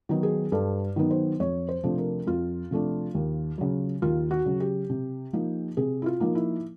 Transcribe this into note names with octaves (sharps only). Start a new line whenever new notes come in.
D#3 F#3 B3 D#4
G#4
G2 A4
D#3 F#3 B3 D#4
C5
F2 C#5
C5
C3 F3 A3 D4
A#4
F2 F4
C3 F3 A3 D4
D#2
C#3 F#3
D#2 F4
F#4
C#3 F#3
G4
C3
F3 A#3 D#4
C3 G#4
E4
F4
F3 A#3 D#4
E4